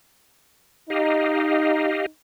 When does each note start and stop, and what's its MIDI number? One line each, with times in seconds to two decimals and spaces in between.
0.90 2.09 63
0.90 2.06 67
0.90 2.06 75
0.90 2.06 77